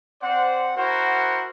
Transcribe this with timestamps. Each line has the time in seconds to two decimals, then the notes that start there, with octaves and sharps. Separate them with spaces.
0.22 C4 C5 D5 F#5
0.75 E4 F#4 A#4 C5 F#5